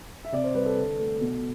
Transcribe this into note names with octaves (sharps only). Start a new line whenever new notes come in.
E5
C3 D5
C5
G3 B4
A4
D3
A3
B2